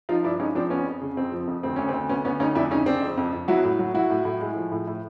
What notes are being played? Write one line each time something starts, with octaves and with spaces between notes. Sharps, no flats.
F3 D#4 F4
G2 D4 E4
G#3 C#4 D#4
F3 C4 D4
F2 B3 C#4
F2
C#3
F2 C4
F3
F2
D2 C4
D2 C#4
C4
D2
D2 B3 C#4
D2 B3 C#4
D2 C#4 D#4
F2 D4 E4
C#3 C#4 D#4
C#3 C4 D4
F2
F2
F2
F#3 E4 F#4
A2
F#3
F#3 E4 F#4
A2
A2
G#3
F3
A2
A2